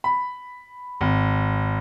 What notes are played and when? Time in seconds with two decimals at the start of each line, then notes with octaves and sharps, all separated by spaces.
0.04 B5
1.01 G#1